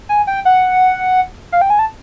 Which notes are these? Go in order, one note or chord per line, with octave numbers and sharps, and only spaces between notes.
G#5
G5
F#5
F5
G5
G#5
A5